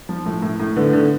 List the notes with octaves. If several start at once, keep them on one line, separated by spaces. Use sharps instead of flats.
F3
A2
A2
A2
D3 B3
D3